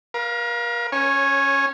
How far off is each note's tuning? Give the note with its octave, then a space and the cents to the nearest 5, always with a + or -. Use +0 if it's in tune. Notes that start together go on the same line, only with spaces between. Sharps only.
A#4 +40 F5 +0
C#4 +0 C#5 -20 G#5 +0